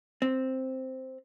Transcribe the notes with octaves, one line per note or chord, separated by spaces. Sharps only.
C4